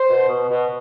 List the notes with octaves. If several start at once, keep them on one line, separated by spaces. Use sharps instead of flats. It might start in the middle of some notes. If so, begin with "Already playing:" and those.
Already playing: C5
B2
B2
B2